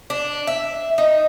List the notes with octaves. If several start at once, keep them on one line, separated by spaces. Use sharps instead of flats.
D4
E5
D#4